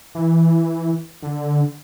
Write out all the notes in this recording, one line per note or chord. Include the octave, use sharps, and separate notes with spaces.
E3
D3